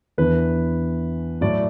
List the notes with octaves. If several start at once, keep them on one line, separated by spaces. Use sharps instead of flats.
E2 E3 B3 D4 B4
A2 F#3 A3 D5